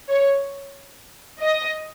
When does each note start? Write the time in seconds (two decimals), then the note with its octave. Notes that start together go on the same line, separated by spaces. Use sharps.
0.09 C#5
1.41 D#5